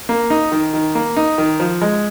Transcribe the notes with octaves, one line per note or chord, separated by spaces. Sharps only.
A#3
D#4
D#3
D#3
A#3
D#4
D#3
F3
G#3